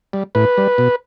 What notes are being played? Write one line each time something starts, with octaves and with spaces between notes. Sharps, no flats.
G3
A2 B4
G3
B2